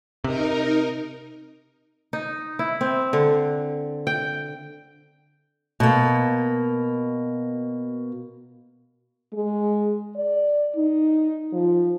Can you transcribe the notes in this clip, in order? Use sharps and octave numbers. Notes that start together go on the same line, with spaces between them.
C3 D#4 A#4
D#4
E4
C4
D3
G5
B2 A#3
G#3
D5
D#4
F3